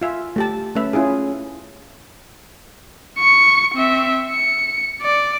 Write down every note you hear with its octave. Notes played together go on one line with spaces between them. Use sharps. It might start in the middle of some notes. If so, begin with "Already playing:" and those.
F4 E5 G#5
A3 G4 A5
A3 C#4 B4 E5
C#4 E4 F4 G#4
C#6 C#7
C4 E5
C#7
D5